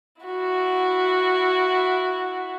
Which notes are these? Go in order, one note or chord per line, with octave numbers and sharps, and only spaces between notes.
E4 F#4